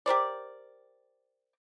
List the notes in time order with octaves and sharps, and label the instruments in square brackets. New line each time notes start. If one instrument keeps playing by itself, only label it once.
[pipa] G4 A#4 C5 D5